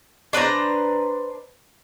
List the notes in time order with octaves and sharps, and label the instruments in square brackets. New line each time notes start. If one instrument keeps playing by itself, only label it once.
[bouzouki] D4 B4 C5 A#5